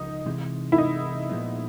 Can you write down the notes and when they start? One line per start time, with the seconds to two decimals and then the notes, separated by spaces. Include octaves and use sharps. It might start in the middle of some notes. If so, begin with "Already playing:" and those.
Already playing: C#2 F3 D#4
0.26 C3 E3 G#3
0.72 E4
0.78 D#4
1.30 A#2 F3 G#3 B3